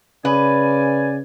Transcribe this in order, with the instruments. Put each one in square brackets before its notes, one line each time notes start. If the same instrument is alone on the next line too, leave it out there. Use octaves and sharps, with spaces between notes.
[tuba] C#3 [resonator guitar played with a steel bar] B4 [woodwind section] D5 G#5